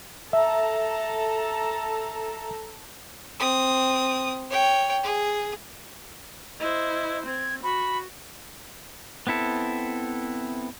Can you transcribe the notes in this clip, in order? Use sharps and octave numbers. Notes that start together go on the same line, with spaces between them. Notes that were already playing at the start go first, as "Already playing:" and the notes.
A4 E5 A5 A#5
C4 D#6
C#5 G5
G#4
E4 C5 D#5
C4 G#6
F#4 B5
B3 C4 E4 A4